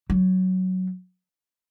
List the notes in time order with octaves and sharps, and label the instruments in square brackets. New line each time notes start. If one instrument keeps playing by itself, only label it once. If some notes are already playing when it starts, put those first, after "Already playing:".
[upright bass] F#3